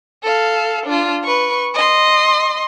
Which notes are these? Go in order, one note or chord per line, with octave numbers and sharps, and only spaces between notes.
A4 F5
D4 F4
B4 C#6
D#5 C6